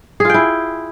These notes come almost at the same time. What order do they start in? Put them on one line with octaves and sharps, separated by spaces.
G#4 F4 G5 E4